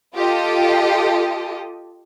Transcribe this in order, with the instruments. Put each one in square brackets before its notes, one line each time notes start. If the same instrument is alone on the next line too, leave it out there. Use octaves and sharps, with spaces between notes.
[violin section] F4 G4 A4 D#5